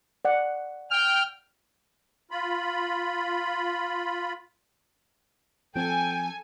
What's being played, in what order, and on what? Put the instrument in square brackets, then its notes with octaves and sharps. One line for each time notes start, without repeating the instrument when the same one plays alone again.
[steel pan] D5 F#5
[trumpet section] G5 [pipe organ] F6
[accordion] F4 B5
[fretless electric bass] F3 C4 [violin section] A4 G#5 [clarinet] G5